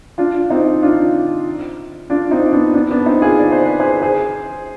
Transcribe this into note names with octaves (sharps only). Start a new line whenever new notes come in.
D4 F4
C4 D#4
D4 F4
D4 F4
C4 D#4
B3 D4
B3 D4
B3 D4
C4 D#4
F4 G#4
D5
C5
B4
G#4 C5
G#4 C5